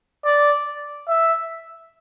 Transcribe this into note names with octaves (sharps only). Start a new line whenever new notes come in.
D5
E5